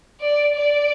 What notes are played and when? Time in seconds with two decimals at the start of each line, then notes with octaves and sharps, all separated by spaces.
0.20 D5
0.55 D5